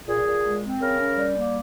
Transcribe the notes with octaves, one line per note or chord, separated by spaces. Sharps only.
A#2 G#4
A#2
G#3
C4
C#3 A#4
C#4
G3
A#3